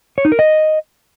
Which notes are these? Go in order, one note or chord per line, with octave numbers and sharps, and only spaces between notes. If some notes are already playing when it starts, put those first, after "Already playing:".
C#5
D#4
A#4
D#5